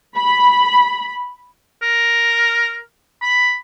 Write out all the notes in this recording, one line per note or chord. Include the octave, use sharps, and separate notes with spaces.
B5
A#4
B5